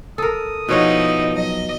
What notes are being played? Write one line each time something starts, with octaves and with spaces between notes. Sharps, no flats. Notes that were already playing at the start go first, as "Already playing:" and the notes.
A4 A#4 D#6
B2 F3 D#4 E4 C#5 F#5
F#3 D#5